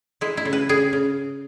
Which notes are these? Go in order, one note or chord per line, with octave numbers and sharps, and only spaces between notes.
G#3 E4
E4
C#3
B4
C#3 G#4
C#3